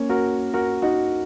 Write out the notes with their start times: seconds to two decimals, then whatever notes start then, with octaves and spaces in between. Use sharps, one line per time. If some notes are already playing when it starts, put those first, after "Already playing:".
Already playing: A#3 C#4
0.09 F#4 A#4
0.53 F#4 A#4
0.82 D#4 F#4